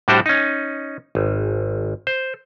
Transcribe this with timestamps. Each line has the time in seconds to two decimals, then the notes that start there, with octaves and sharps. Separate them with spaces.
0.08 A2 G3 D4 F#4 G4 C5
0.26 C#4 D#4
1.15 G#1
2.07 C5